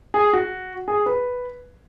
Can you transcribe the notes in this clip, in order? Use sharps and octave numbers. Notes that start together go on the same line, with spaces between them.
G#4
F#4
G#4
B4